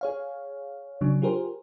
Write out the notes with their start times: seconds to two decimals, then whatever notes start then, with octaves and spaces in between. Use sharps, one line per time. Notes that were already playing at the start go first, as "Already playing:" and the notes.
0.01 G#4 C#5 F5
1.01 C#3 F#3 D4
1.22 F4 G4 G#4 A#4 C5